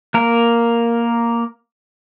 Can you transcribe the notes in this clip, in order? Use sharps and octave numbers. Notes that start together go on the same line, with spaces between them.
A#3 A#4